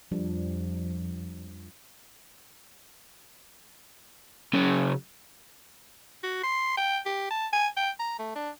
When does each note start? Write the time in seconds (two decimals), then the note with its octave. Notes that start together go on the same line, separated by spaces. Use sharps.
0.11 F2 F3 G3 D4
4.53 C#3 F#3
6.23 F#4
6.44 C6
6.77 G5
7.06 G4
7.30 A5
7.53 G#5
7.77 G5
7.99 A#5
8.19 A3
8.35 D4